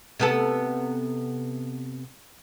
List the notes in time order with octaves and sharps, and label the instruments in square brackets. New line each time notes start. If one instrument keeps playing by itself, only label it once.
[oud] C3 B3 A4